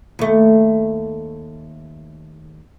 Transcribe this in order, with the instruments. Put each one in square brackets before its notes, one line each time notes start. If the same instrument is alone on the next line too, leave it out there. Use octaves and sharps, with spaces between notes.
[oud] D#2 A3